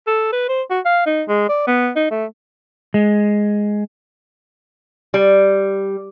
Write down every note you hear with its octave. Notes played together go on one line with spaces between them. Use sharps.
A4
B4
C5
F#4
F5
D#4
G#3
D5
B3
D#4
A3
G#3
G3